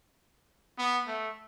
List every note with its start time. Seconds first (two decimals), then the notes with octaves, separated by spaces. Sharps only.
0.77 B3
1.07 A3